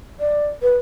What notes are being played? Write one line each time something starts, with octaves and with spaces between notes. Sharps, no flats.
D5
B4